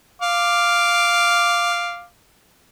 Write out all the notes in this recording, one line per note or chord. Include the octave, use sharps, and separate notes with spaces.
F5 D6